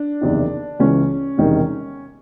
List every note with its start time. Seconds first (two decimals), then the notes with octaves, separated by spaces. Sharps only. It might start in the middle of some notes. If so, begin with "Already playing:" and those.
Already playing: D4
0.21 F#1 E2 C3 D#3
0.79 C#2 C#3 E3 C#4
1.38 E1 E2 C3 D#3